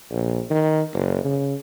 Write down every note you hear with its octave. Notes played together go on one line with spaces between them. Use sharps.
A#1
D#3
F#1
C#3